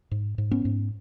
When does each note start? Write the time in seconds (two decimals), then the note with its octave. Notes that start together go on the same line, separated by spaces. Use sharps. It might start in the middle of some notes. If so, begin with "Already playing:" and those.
0.11 G#2
0.38 G#2
0.51 B3 C#4
0.65 G#2